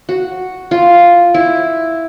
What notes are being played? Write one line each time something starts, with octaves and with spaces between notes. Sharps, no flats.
F#4
F4
E4